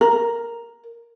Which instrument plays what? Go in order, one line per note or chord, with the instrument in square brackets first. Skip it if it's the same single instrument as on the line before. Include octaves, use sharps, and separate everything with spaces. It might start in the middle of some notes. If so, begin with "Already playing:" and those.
[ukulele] A#4